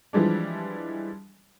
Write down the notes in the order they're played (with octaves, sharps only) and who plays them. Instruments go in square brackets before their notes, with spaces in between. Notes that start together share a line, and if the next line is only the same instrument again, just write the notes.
[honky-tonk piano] E3 F3 G3 G#3 D4